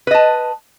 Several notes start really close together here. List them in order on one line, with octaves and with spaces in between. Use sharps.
B4 D#5 A5